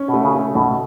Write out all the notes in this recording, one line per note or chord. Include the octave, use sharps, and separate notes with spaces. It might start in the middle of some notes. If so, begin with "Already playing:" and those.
Already playing: C#4
B2
A3
C#3
A3
A1 B2